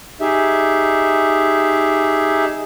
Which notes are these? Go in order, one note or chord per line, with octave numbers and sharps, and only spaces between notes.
D#4 G4 G#4 E5